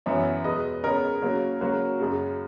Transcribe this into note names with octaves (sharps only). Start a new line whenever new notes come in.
F#2 E3 B3 C#5 E5
E2 B2 G#3 B4 D#5
C#3 G#3 B3 A#4 C#5
C#3 F#3 A#3
C#3 F#3 A#3 F#4 A#4
F#2 C#3 G#3